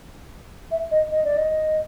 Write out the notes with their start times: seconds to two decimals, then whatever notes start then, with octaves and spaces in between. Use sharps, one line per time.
0.71 E5
0.91 D#5
1.11 D#5
1.24 D5
1.37 D#5